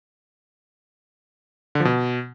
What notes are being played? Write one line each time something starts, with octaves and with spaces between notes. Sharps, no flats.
D3
F3
B2